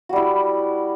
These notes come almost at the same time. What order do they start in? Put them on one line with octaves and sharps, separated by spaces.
F#4 G3 E4